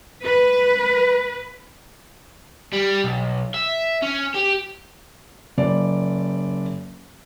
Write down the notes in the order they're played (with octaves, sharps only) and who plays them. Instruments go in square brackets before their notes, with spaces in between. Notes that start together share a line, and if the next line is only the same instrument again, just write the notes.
[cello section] B4
[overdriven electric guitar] G3
B1
E5
C#4
G4
[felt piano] F#1 D5